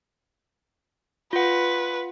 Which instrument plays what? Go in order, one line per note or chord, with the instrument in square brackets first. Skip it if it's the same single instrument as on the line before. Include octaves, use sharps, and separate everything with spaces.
[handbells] F4 F#5 [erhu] B4